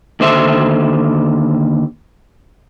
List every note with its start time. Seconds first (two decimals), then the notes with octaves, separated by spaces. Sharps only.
0.20 D#2 D3 C5 E5